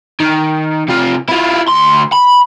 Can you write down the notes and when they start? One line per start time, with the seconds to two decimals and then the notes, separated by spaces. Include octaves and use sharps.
0.20 D#3
0.88 C3 F4
1.28 E4 F4
1.68 D2 C6
2.12 B5